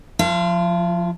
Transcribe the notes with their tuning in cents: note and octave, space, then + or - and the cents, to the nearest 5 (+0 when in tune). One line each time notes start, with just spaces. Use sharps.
F3 +15 F4 -40 F5 -40